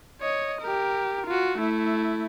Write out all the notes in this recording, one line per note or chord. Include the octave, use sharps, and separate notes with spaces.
C#5 D#5
G4 A#4
F4 F#4
A3 E4